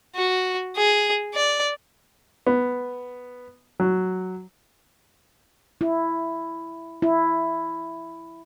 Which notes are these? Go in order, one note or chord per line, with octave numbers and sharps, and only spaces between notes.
F#4
G#4
D5
B3
F#3
E4
E4